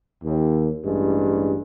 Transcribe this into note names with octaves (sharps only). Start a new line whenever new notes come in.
D#2
A1 G2 G#3